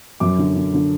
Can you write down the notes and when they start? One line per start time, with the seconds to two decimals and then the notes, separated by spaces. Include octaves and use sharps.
0.20 F#2 D6
0.39 D3
0.56 D3
0.74 D3